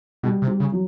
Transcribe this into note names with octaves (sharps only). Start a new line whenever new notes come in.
B2 G3
C3
G3
C#3
F#3